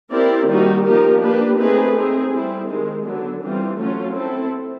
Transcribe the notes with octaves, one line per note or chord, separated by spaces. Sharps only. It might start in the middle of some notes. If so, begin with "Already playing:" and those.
C4 E4 G4 A#4 D5
D#3 G3 A#3 D#4 F#4
F3 A#3 D#4 G4 A#4
A#3 D4 G4 B4
A3 C4 D#4 G#4 B4
C4 D#4 G#4
G3 C4 E4
D#3 G#3 C4
D3 F#3 B3 D4
E3 G3 C4 F4
F#3 A3 C#4 F4
C4 E4 A4